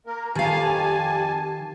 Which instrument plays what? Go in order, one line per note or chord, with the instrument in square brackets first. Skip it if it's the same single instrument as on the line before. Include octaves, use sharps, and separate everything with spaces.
[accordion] A#3 A#4
[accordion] F2 G#5 A5 [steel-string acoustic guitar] D#3 F5 [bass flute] G4